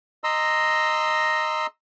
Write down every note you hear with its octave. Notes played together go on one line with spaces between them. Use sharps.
D#5 A#5 C6 E6